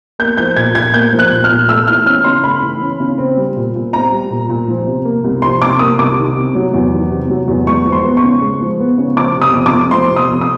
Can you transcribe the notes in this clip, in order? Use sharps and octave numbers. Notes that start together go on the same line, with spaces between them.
A#3 G6
F3 G6
A#2 G#6
A#2 G#6
A#3 G6
F3
F#6
A#2
F6
A#2
A3 E6
E3 F6
C#4 F6
C#3 C6
A3 B5
E3
C#4
C#3
C4
G3
A#2
A#2
C4 A#5
G3
A#2
A#2
F3
C3
A#3
C2
F3 C6
C3 D6
A#3 D#6
C2 D6
D#3
C3
F#3
E2
D#3
C3
F#3
E2
G#3 C#6
F3
C6
B3
C#6
C#3
G#3
F3
B3
C#3
F3 D6
C3
D#6
F2
D6
F2
F3 C6
C3
D#6
F2
D#6